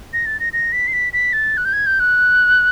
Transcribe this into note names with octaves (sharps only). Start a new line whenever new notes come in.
A#6
A6
A#6
A#6
B6
C7
B6
B6
A6
F#6
G6
G#6
G6
F#6